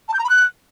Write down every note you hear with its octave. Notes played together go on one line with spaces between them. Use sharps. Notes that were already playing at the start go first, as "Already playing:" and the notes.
A5
G6
A#5
B5
F#6